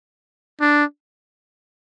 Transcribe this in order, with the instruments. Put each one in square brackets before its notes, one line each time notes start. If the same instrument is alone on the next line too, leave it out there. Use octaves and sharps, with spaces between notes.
[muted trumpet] D4